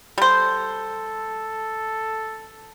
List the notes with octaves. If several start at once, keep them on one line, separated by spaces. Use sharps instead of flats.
G3 A4 C5